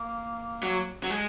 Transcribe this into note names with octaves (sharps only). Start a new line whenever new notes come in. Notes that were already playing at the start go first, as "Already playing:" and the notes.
Already playing: A#3
F#3
F#3
G#3